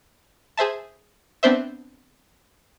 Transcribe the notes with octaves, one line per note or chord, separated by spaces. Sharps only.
G#4 C5 E5 A5
B3 C4 D4 C5 E5